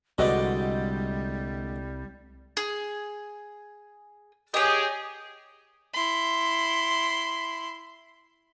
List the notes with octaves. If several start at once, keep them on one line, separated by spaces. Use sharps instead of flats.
C2 D3 G3 G#3 F#4 B4 D5 D#5
G#4
G4 G#4 C#5 D#5
E4 C6